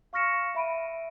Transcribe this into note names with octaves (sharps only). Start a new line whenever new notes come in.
F5 C#6 F6 A#6 C#7 E7
E5 B5 D7 D#7